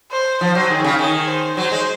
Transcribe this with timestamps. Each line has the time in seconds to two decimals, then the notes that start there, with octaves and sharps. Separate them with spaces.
0.11 C5
0.41 F3 C5
0.55 F#3
0.70 D#3 G#4
0.84 C#3
0.99 D#3 G#4
1.27 C5
1.57 F#3 C5
1.72 G#3